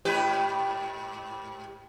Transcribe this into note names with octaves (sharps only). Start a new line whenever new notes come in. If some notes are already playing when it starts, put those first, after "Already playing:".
G#2 G4 B4